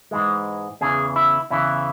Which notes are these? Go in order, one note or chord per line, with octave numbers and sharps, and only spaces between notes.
G#2 E3 G#3
E2 C#3 E3 G#4
E4
E2 C#3 E3 E4